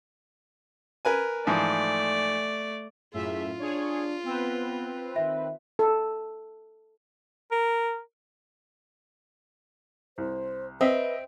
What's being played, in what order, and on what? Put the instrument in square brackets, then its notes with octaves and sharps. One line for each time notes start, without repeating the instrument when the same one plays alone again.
[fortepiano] A#4 B4 G#5
[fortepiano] G#2 E3 F3 [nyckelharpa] A3 D5
[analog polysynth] F#2 A2 E5 [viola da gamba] F4 [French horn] G#4
[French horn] D4 [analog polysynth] G#4 C#5
[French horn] B3 [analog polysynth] C4 B4
[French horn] D#3 [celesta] E5
[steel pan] A4
[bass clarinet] A#4
[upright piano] C2 [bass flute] C5
[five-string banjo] C4 [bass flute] B4 [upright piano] D#5 E5